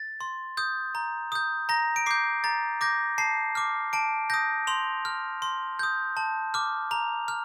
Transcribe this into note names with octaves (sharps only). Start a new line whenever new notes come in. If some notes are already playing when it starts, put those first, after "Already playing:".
Already playing: A6
C6
D#6 G6
A#5
D#6 G6
A#5 A#6
D7
D6 G6 C7
A#5 A6
D6 G6 A#6
A5 C7
D6 F6
A5 D7
D#6 G6 A#6
C6 F7
F6
C6
D#6 G6
A5
D6 F6
A#5 F7
F6